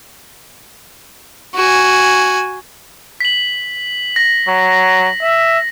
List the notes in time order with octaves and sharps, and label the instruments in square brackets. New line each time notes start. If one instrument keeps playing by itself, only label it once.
[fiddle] F#4 G#5
[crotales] B6 F#7
A#6
[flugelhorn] F#3
E5